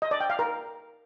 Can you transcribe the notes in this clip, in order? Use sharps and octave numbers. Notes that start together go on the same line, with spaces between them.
D#5
D5
G5
F5
A#4